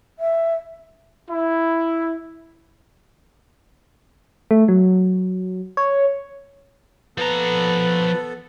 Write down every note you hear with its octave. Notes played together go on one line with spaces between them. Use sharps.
E5
E4
A3
F#3
C#5
F3 B3 A4 B4 A#5